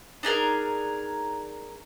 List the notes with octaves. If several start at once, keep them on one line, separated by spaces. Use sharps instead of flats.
D4 D#4 G#4 A#4